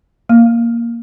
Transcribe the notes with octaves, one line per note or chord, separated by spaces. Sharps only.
A#3